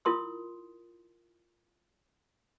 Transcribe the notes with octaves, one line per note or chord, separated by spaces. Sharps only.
E4 F4 A#4 C6 D#6